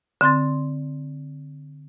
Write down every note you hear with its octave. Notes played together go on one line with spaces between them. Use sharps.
D3 C4 C6 A6